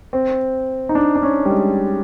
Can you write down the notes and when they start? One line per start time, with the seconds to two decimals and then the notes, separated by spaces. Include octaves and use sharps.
0.13 C4
0.89 D#4
0.95 D4
1.15 D4
1.23 C#4
1.45 G3
1.50 G#3